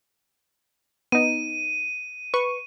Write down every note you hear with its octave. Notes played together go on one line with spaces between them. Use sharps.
B3 D#4 D#7
B4 C#6